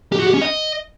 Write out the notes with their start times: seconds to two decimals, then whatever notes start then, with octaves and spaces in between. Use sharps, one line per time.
0.12 G4
0.20 F#4
0.27 G4
0.34 C#4
0.41 D#5